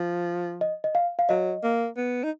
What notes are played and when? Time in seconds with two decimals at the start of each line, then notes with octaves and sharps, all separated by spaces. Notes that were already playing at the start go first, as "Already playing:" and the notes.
Already playing: F3
0.61 D#5
0.84 D#5
0.95 F5
1.19 F5
1.29 F#3 D#5
1.63 A#3
1.97 B3
2.23 D#4